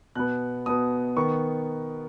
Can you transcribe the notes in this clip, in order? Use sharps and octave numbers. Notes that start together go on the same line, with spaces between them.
B2 B3 F#6
B2 B3 D#6
D#3 B3 C#6